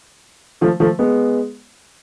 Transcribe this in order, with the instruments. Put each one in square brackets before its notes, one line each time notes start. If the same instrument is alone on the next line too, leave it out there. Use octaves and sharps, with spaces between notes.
[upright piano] F3 A3
F3 A3
G#3 B3